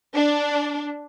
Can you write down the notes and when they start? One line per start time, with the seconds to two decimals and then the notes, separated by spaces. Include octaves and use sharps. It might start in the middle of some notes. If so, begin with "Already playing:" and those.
0.15 D4